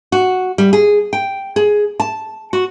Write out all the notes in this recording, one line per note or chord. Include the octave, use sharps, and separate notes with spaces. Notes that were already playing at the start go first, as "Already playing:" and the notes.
F#4
G3
G#4
G5
G#4
A5
F#4